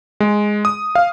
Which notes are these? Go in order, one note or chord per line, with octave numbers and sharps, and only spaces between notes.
G#3
D#6
F5